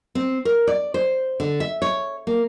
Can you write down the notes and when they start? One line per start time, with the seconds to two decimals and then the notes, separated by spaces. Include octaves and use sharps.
0.15 C4
0.45 A#4
0.67 D5
0.94 C5
1.40 D3
1.60 E5
1.82 C#5
2.27 A#3